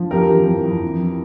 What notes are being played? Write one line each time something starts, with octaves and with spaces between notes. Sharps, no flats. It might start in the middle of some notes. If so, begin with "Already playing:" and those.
Already playing: F3
F2 G4 A#4
E3
F2
F2
E3